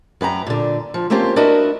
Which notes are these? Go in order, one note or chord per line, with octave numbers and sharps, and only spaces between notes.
F#2 B4 G5 A#5
A#2 D3
F3
A3 A#3 C4 C#4 F4 G4
D4 E4 F#4 A#4 B4 D#5